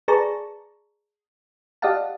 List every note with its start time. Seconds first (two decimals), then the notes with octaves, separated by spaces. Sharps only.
0.08 G#4 B4 D5 A5 A#5 C#6
1.82 G4 D5 D#5 F5 F#5 A5